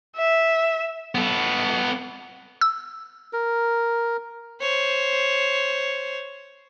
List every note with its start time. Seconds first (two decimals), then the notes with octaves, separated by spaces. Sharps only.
0.16 E5
1.15 B3 A4
2.61 E6
3.33 A#4
4.61 C5 C#5